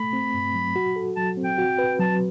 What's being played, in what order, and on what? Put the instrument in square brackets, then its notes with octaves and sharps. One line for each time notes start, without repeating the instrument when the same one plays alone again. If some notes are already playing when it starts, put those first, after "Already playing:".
Already playing: [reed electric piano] A3 [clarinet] B5
[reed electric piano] C4
G2
F#3
F#4
A4
[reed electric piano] F#3 [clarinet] A5
[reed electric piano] C4
[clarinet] G5
[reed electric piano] F#4
B4
[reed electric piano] F#3 [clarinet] A5